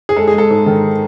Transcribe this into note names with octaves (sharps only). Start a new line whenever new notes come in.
G#4
G#3 A4
G#4
G#3 A4
G#2
D#3